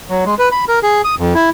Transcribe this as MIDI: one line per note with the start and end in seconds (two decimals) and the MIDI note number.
0.10 0.24 54
0.25 0.35 56
0.39 0.49 71
0.52 0.65 83
0.68 0.79 70
0.83 1.02 68
1.04 1.15 87
1.19 1.34 41
1.35 1.50 64